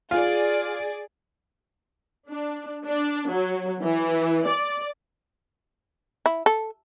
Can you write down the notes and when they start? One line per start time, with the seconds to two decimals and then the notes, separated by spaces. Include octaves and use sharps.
0.11 F4 G#4 D5
2.29 D4
2.85 D4
3.29 F#3
3.81 E3
4.46 D5
6.26 E4
6.46 A4